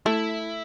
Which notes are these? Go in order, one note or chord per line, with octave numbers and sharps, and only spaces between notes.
A3 E4